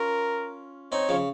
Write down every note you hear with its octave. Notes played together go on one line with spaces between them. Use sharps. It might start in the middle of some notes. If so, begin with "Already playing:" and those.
Already playing: C#4 F4 A#4
C4 D#4 C#5
C#3 F3